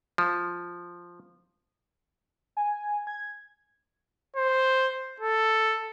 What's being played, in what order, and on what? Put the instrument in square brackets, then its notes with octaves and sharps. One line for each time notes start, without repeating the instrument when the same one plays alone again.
[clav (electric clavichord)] F3
[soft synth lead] G#5
G#6
[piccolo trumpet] C5
A4